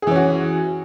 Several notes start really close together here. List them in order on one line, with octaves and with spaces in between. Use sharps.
G#4 E3 C#4 F#4